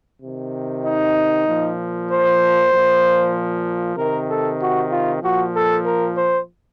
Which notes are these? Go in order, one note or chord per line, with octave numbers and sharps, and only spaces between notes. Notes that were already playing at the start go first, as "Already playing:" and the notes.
C3 D#3
D#4
A#2 F3
C5
A#2 F3
C3 D#3 A#4
A4
F#4
F4
A#2 F3 F#4
A4
A#4
C5